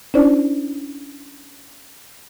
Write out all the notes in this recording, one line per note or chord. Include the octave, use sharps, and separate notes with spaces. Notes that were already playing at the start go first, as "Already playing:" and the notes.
C#4 D4 E4 C5 D5